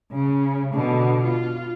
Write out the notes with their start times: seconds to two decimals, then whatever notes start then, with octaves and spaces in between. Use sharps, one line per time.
0.12 C#3
0.74 B2 D3
1.24 F4